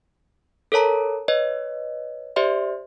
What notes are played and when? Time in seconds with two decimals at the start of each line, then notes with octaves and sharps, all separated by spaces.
0.72 A4 A#4 C#5 A5 A#5
1.28 B4 C#5 D#5
2.36 G4 C5 D5 E5 C6